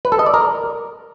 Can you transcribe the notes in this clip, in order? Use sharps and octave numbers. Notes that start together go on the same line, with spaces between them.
B4
A4
D#5
D5
A#4